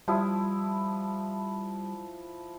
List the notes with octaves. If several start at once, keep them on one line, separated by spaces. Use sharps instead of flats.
F3 G3 E4 D#6